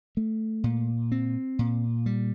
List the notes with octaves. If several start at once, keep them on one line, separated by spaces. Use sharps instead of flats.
A3
A#2
C4
A#2
G3